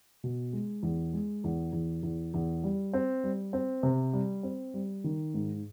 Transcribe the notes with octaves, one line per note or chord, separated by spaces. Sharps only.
B2
G#3
E2
G#3
E2
E2
E2
E2
G3
C4
G3
C4
C3
G3
C4
G3
D#3
G#2